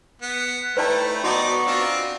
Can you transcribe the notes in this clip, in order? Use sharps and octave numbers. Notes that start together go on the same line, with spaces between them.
B3
A3 D#4 E4 B4 D5 G5 A5
B3 D#4 F#4 D5 A#5 C#6 D6
C4 D4 F4